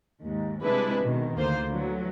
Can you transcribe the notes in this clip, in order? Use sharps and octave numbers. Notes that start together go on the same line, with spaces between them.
D#2 G#2
C3 G3 G#3 D4 E4 B4
B2 D#3
D2 A#3 F4 C5
D3 E3 F#3